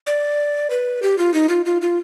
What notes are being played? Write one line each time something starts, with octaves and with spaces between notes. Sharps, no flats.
D5
B4
G4
F4
D#4
F4
F4
F4